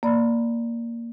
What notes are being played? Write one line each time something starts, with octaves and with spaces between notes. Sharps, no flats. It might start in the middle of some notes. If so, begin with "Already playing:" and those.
A#3 D5 B5